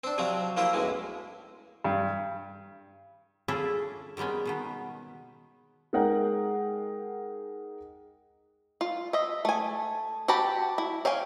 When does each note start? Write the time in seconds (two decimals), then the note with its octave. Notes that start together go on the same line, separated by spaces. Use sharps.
0.04 C4 D4
0.18 C3 F3 F#3 C4
0.57 F3 A#3 E4 F4 G4 F5
0.73 B1 F#2 A2 G#3
1.84 G2
3.48 C#4 D4 E4 F4 G#4 A4
4.17 D#3 G3 G#3 B3 C#4
4.45 B2 D#3 B3
5.93 G#3 D#4 G#4 A#4 F#5 G5
8.81 F4
9.13 D#5 E5
9.45 A3 G#5
10.28 F#4 G4 A5 B5
10.78 E4
11.05 C#5 F5 G5 G#5